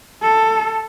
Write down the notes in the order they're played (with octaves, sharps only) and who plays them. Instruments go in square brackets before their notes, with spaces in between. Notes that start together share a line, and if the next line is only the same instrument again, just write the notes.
[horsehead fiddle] A4